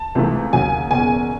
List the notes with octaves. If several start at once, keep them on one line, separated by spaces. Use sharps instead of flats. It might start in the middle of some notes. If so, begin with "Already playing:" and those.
Already playing: A5
C#2 C3 E3 A3
D#2 C#3 F#3 G#5
F#1 E2 B2 G#5